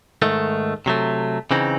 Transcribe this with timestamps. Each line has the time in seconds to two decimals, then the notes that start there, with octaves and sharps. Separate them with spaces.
0.22 G#2 D#3 A3
0.86 C3 F#3 A3
1.51 C#3 E3 C4 D#4